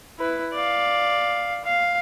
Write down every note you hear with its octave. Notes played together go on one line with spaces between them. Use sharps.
E4 B4
D5 F5
F5